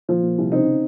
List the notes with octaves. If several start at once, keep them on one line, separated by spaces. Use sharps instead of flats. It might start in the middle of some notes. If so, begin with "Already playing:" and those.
A#2 F3
A#2
C2
C#3 C4 D#4
C#3